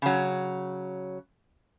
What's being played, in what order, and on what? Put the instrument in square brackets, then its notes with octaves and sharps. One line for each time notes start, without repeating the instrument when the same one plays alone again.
[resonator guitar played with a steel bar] C#3 F#3